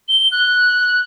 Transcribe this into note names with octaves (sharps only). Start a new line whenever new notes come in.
G7
F#6